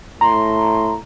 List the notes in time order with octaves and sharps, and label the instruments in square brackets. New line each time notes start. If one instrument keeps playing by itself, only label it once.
[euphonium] A2 [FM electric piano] A#5 [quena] C6